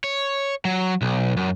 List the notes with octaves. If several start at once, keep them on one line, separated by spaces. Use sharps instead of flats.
C#5
F#3
B1
F#2